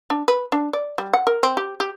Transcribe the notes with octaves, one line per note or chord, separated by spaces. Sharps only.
D4
B4
D4
D5
G3
F#5
A#4
C4
G4
G4